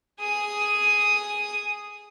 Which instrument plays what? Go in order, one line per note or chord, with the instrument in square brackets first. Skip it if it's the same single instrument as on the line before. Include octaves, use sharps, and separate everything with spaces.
[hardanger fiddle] G#4 D#6